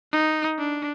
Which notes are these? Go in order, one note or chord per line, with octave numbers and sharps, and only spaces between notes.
D#4
D4